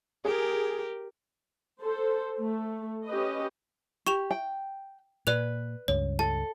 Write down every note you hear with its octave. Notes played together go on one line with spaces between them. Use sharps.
G4 G#4 A#4
A4 C5
A3
C#4 G4 B4 D#5
G4 C#6 E7 F7
G5
A#2 B4 D5 F#6 F7
C#2 G2 C#5
A4 A5